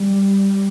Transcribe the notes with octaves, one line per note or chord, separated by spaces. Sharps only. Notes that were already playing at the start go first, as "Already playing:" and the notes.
Already playing: G3